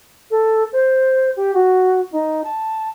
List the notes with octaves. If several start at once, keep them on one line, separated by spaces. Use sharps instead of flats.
A4
C5
G4
F#4
D#4
A5